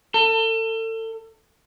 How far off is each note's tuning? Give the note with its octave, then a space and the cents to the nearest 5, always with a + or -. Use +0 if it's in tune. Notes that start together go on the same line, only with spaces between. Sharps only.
A4 +35